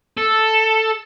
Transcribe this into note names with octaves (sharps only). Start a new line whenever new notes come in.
A4